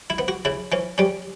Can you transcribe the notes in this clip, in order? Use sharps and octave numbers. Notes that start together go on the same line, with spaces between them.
E4
B3
F#4
C#3 E4
E3 C#4
G3 C#4